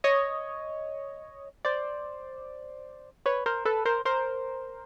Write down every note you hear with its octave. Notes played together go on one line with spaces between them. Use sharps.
C#5 D#5
C5 D5
B4 C#5
A#4 C5
A4 B4
A#4 C5
A#4 C5